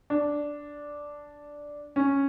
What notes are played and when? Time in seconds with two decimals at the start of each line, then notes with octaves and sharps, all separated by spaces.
0.10 D4
1.96 C#4